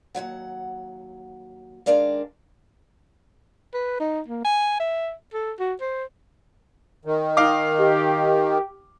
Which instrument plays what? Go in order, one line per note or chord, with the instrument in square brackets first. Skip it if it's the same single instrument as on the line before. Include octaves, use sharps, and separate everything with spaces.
[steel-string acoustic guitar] D#2 G#2 F#3 F#5
D#3 G#3 D4 A#4 D5 F5
[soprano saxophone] B4
D#4
A#3
G#5
E5
A4
F#4
C5
[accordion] D#3
[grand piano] D#4 F5 D6
[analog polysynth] G4